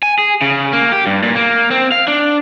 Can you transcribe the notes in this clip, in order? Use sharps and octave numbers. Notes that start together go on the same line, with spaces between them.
G#5
G#4
C#3
A#3
G4
G2
A#2
A#3
C4
F5
D4